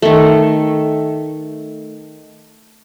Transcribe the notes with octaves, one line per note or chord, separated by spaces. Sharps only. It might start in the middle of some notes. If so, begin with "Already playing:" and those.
D#3 A3